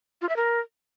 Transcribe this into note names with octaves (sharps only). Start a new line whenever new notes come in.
F4
E5
A#4